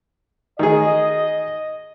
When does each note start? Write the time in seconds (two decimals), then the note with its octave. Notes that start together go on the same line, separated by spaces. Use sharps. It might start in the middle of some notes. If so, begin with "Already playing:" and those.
0.59 D#3 G#4 D#5